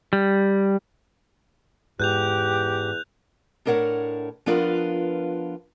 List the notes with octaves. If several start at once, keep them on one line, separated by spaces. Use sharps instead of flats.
G3
E2 G#2 G4 F#6 G6 F7
A2 D4 A#4 C#5 F#5
F3 B3 D4 F4 A#4 B4